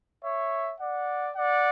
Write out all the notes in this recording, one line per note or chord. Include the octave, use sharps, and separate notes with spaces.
C#5 E5
D5 F#5
D5 F#5